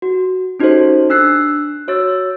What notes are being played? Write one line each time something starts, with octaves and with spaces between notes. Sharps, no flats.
F#4
C#4 D#4 F#4 G4 A4 C5
D4 E6 F#6 C7
F#4 C#5 E6 A6